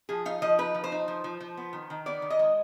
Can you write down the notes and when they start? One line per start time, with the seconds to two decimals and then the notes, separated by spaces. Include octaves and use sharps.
0.09 F3 G#4
0.26 D#4 F5
0.42 F3 D#5
0.59 D#4 B4
0.75 F3
0.84 C5
0.92 D#4
1.08 F3
1.24 F3
1.40 F3
1.57 B3
1.73 D#3
1.90 D#3
2.06 B3 D5
2.22 D#3
2.30 D#5
2.39 G#3